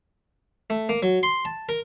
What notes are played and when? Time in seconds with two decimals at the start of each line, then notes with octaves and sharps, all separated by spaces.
0.70 A3
0.89 A#3
1.03 F#3
1.23 C6
1.45 A5
1.69 A#4